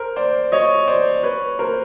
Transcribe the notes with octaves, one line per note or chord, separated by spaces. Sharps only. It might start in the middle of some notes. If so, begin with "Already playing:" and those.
Already playing: A#4 C5
C5 D5
C#5 D#5
C5 D5
B4 C#5
A#4 C5